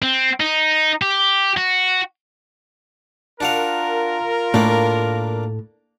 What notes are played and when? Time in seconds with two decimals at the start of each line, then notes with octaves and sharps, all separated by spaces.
0.02 C4
0.40 D#4
1.02 G4
1.57 F#4
3.41 D4 F4 F#4 A#4 F5
4.54 A2 A#3 D4